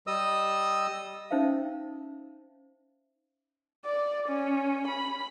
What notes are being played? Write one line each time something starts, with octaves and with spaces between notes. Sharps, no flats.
G3 D#5 D#6 E6
C#4 D#4 C5 E5 F5
D5
C#4
B5